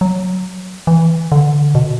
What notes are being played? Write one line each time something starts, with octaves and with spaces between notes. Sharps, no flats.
F#3
E3
D3
B2